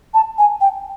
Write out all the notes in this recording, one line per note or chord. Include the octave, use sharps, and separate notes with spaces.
A5
G#5
G5